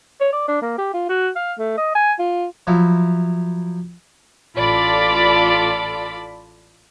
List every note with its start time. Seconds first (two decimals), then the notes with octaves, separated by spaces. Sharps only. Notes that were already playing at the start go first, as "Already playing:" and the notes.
0.21 C#5
0.32 D5
0.48 D4
0.62 A#3
0.78 G4
0.94 F4
1.09 F#4
1.36 F5
1.59 A3
1.78 D#5
1.95 G#5
2.19 F4
2.67 F3 F#3 E4
4.56 A1 F4 A4 D5 B5 D6